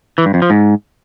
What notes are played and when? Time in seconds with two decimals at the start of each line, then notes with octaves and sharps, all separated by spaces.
0.18 E3
0.26 G2
0.34 F2
0.42 F3
0.50 G#2